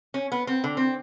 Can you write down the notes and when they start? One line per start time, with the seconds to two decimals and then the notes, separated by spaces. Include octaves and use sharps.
0.14 C#4
0.32 B3
0.47 C4
0.64 D3
0.77 C4